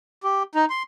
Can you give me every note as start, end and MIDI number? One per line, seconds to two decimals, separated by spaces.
0.23 0.43 67
0.55 0.65 63
0.70 0.83 84